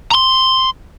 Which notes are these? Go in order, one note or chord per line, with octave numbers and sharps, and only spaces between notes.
A#5 C6